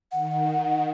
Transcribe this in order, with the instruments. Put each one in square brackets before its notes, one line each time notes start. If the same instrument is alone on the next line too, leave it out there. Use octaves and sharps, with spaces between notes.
[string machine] D#3 [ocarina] F#5